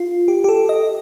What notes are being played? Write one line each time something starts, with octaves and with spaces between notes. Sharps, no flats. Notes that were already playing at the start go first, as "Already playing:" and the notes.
Already playing: F4
G4
G4
A4
D#5